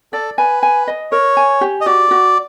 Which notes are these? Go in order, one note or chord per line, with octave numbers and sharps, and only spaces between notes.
A4 D5
B4 G#5
G#5
D#5
A#4 C#5
G#5
G4
D#5
F#4 D5
F#4